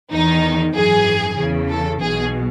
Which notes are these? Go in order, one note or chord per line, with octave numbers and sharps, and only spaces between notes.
E2 D#3 D#4
G#1 F#2 E3 G#4
E2 C#3 E3
A4
B1 B2 G#4